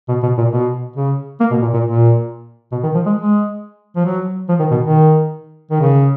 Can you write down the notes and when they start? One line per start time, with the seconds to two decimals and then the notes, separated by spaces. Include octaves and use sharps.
0.09 B2
0.23 B2
0.38 A#2
0.52 B2
0.96 C#3
1.40 A#3
1.51 B2
1.62 A#2
1.73 A#2
1.85 A#2
2.72 B2
2.83 D#3
2.95 F3
3.06 G#3
3.16 G#3
3.96 F3
4.05 F#3
4.49 F3
4.60 D#3
4.71 B2
4.82 D#3
5.71 D#3
5.81 C#3